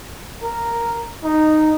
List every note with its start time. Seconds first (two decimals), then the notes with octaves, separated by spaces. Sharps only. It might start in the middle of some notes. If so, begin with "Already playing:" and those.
0.43 A#4
1.24 D#4